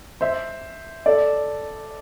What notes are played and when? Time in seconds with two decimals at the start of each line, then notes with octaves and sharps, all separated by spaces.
0.21 C5 E5
1.06 A4 D5